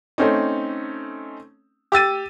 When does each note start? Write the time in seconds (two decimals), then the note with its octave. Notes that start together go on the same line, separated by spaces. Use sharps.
0.18 A3 C4 C#4 D#4
1.92 G4 E6 A6 D#7